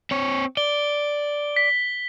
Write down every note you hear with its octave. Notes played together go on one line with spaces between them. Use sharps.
C4 C#5
D5 G7
B6